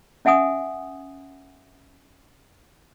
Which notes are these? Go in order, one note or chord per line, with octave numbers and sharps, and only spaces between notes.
C#4 E5 F#5 G#5 D#6